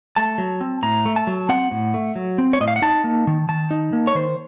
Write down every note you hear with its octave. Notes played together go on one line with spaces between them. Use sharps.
A3 A5
F#3
C4
A2 A#5
A3
A5
F#3
C4 F#5
A2
A3
F#3
C4
C#5
A2 D#5
F5
F#5
D#4 A5
A#3
D#3
D#3 A5
D#4
A#3
C#5
D#3 C5